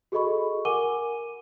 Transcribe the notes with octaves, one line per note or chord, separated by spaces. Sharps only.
F#4 G#4 A4 D#5 B5 C#6
A#4 F#5 G#5 D6 D#7 G7